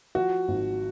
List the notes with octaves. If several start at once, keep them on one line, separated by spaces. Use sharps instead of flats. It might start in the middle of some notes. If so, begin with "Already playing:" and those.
F3 F#4
G#1